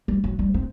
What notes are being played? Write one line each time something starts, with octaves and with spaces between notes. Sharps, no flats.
G3
F#3
G3
C4